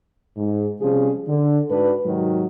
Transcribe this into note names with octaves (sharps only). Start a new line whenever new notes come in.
G#2
C3 F3 G3 C#4 G#4
D3
G#2 D4 F#4 B4
G#2 C3 D#3 F#3